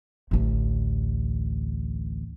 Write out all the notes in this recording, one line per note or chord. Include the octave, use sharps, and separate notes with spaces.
A1 D2